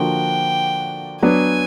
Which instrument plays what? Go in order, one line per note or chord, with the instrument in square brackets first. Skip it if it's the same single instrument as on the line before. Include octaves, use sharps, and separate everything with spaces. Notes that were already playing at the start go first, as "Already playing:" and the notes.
Already playing: [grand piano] D3 F3 A#3 D4 F#4 [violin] G5
[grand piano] F#3 B3 D4 [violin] G#5